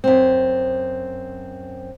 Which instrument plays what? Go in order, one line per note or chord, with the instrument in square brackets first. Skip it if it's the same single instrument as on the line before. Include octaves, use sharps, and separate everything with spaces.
[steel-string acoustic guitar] F#2 C4